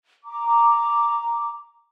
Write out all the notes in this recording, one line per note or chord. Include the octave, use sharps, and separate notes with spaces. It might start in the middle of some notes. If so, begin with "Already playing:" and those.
A#5 D6